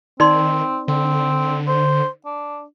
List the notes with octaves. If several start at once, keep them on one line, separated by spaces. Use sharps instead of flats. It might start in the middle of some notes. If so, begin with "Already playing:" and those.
D#3 C4 D#4 D5 C6
D3 C4
C5
D4